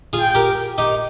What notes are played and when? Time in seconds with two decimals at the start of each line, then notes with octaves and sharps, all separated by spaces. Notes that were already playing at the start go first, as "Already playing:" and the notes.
0.13 F4 G#4
0.20 G5
0.35 G4 A#4
0.78 D#4 G4